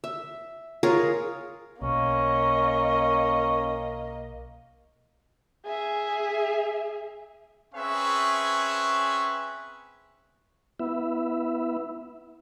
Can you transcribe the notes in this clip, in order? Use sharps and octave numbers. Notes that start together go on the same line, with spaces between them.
E5
F4 G#4 A#4 C#5
B1 A#3 C#4 D#5
G#4 E5
C4 C#4 G#4 B4 E5 C#6
B3 E4 E5